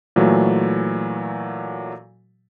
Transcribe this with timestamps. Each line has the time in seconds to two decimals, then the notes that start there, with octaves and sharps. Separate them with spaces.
0.16 A#2 E3 F#3 A3